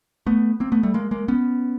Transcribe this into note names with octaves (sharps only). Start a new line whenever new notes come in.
A3 B3
A#3 C4
A3 B3
G3 A3
G#3 A#3
G#3 A#3
B3 C#4